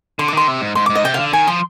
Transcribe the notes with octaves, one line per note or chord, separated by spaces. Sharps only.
D3 C6
D6
D#3 C6
C3
G#2
G#2 C6
G#2 D6
D#5
C3 G5
D3 F5
D#3 G#5
F3 C6